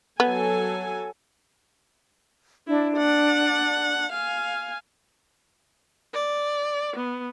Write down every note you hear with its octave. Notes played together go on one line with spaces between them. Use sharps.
F#3 B3 A4 G#5
D4 E4
F#5
F5 G#5
D5
B3